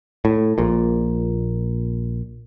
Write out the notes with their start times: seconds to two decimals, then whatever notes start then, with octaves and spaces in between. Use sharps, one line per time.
0.25 A2
0.58 A#1 A#2